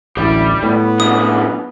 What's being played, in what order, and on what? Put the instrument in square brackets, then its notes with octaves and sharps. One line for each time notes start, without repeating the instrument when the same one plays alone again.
[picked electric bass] A1 D2 [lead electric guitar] G3 [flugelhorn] E4
[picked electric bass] A2 [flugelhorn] B3
[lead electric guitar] F#2 D3 [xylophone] D#6